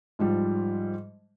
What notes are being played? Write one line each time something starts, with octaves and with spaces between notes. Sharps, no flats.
G#2 F3 G3